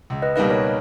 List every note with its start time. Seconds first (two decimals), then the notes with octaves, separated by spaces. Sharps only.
0.10 C#2
0.22 B4 D#5
0.36 B2 G3 A#3 D#4 B4 D#5
0.50 A#4 C#5